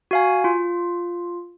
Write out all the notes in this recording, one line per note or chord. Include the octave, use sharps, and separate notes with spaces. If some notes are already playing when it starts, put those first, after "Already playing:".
F#4 F5 G#5
F4